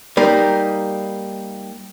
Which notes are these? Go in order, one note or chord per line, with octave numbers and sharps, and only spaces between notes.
G3 A#3 D#4